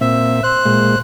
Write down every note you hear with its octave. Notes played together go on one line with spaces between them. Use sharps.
A#2 C4 E5
C5 F#6
A#2 G#3